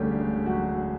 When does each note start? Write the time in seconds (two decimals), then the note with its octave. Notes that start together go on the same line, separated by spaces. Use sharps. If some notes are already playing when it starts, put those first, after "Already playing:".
Already playing: E1 D2 D3 G3 A3 C#4 G4
0.46 F#3 F#4